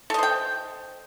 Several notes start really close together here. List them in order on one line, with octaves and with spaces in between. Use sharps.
A4 D#5 C5 G5